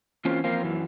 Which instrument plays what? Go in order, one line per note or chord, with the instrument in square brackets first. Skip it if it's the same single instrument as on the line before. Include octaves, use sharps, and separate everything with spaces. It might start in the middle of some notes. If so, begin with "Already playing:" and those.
[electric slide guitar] E3 A#3 C4 C#4 F4
F3 A#3 C4 F4
F#2 E3